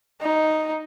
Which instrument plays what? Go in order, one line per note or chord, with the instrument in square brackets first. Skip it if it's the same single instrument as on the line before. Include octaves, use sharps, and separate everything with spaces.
[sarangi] D#4